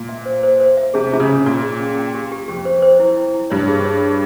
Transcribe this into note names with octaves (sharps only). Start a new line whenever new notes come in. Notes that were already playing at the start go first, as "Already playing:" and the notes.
Already playing: A#2
E5
C5
C5
C5
E5
C3 G#4
C3 F4
C#3
C#5
A#2 F4
G#4
C#4
G5
G4
G4
F2 G4
C5
C5
E4
E4
E4
G2 C#5
G#4
C#5
G#4